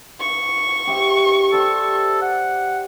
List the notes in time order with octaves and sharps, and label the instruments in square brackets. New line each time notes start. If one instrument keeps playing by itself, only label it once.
[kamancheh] C#6
[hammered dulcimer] G4 C5 E5
[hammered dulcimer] G4 C5 D5 [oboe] A4
[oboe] F#5